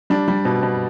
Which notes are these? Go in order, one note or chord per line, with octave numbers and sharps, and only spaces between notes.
G3 D4
G3
B2
B2